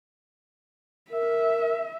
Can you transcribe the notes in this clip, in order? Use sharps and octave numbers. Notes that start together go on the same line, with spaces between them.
A#4 E5